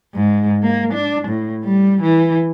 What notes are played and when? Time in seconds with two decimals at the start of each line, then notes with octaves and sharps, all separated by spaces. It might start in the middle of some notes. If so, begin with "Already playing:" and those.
0.14 G#2
0.63 A#3
0.93 D4
1.28 A2
1.64 G3
2.02 E3